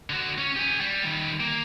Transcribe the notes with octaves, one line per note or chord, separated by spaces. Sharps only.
D3 F#4
C#4
G4 G#5
G3
D#3 G3
A#3